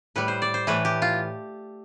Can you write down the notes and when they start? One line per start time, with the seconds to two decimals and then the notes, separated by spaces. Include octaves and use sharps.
0.16 A2 G3 B4
0.28 C5
0.42 D5
0.54 C5
0.67 A2 E3 A3 B4
0.85 G4
1.02 F4